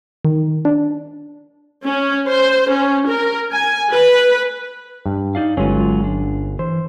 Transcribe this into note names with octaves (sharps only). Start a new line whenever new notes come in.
D#3
D4
C#4
C5
C#4
A#4
G#5
B4
G2
D#4 D5 F5
G1 F#3 G#3 C#4 F4
D4
E3 C5